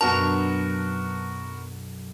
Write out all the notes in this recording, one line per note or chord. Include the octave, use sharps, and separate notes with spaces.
B1 F#2 B3 D4 F#4 A#4 A5